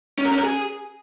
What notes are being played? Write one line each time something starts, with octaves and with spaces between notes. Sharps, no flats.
C#4
A#4
C#4
A#4
G#4